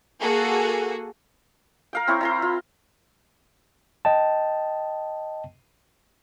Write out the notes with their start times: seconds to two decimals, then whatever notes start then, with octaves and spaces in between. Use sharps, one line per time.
0.20 A#3 F#4 G#4 A4
1.93 A#4 F5 G5
2.07 C4 E4 C#5
2.21 E4 A#5 C6
2.42 F4
4.05 D#5 G5 A5